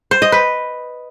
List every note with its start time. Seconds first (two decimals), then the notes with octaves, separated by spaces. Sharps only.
0.11 C5
0.22 D#5
0.32 B4